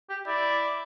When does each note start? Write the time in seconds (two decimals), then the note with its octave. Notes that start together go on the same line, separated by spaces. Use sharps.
0.09 G4
0.27 E4 D5